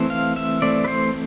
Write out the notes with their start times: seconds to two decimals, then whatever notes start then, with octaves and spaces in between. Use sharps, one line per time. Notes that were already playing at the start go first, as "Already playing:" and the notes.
Already playing: E3 A3 C4
0.10 F5
0.36 E5
0.62 E3 A3 C4 D5
0.84 B4
0.88 C5